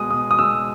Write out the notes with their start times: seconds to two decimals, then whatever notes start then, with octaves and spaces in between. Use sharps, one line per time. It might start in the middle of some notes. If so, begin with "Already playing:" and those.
Already playing: B2 G#3 D#6
0.11 B2 D#6
0.31 D#6
0.39 G#3 E6